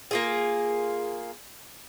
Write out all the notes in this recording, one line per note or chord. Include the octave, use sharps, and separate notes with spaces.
A#3 F4 G#4